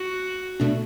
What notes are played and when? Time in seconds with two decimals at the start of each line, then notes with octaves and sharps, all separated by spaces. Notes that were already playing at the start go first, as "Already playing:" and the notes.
Already playing: F#4
0.60 B2 A3 D4